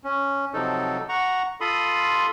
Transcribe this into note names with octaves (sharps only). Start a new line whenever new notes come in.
C#4
C3 F3 F#3 D#4 A4
F#5 A#5 C#6
F4 A4 B5 C6 D#6